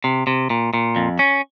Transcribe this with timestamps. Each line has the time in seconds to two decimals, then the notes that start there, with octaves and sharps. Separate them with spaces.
0.04 C3
0.27 C3
0.50 A#2
0.74 A#2
0.96 F2
1.19 C#4